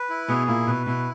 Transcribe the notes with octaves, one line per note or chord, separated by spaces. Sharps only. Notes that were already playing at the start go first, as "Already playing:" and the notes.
Already playing: B4
E4
B2 B3 G#4
A#2 A#3 E4
B2 B4
B2 E4